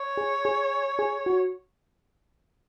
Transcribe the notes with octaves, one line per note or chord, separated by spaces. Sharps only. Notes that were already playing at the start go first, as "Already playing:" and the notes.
Already playing: C#5
G#4
G#4
G#4
F#4